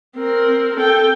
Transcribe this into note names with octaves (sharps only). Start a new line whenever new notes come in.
C4 A#4
A4 G5